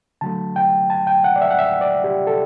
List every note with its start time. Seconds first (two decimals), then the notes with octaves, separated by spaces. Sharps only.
0.21 D3 F#3 A3 A5
0.56 G5
0.90 A5
1.07 G5
1.24 F#5
1.36 D5
1.42 E5
1.51 F#5
1.59 E5
1.81 D5
2.04 G4
2.27 A4